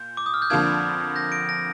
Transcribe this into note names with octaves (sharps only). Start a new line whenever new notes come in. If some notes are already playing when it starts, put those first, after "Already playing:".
Already playing: A#2 G6
D6
D#6
F6
G6
F2 D3 F3 A#3 D4 F6 G#6
G6 A#6
A#6 D7
A#6 D7